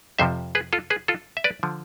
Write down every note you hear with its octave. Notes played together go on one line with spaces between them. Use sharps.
F2 C3 F3 C5 E5
G#4 B4
F4 A4
G#4 B4
F4 A4
E5
B4 D5
D3 F3